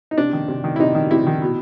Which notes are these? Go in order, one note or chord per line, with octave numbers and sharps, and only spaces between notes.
D#4
C3 D4
D#3
C3
D#3
E4
C3 D#4
D#3
C3 E4
D#3
B2